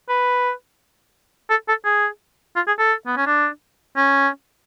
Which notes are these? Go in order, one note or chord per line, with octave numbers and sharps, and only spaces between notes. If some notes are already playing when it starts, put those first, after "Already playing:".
B4
A4
A4
G#4
F4
G#4
A4
B3
C#4
D4
C#4